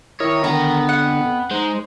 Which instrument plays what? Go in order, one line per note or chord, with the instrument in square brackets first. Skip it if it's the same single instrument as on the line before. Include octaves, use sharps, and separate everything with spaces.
[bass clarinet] D#3 [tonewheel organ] E4 A#4 D#5 [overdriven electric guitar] C#5
[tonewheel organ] D3 [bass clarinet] D#3 [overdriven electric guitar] B3 [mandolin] A#5
[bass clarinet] F2 [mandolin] F#5
[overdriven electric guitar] G#3 [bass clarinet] D#4 [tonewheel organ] C5